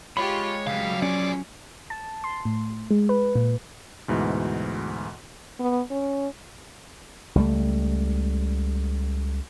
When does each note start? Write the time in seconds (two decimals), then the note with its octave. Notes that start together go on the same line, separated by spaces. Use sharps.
0.17 G#3 F4 G4 C#5 B5
0.67 C#2 F#3 G3 F5
1.02 F3 C#4 G#4 D5
1.90 A5
2.24 C6
2.45 A2
2.91 G#3
3.09 B4
3.35 A#2
4.08 D2 G#2 B2 E3
5.60 B3
5.91 C#4
7.35 C#2 G3 A3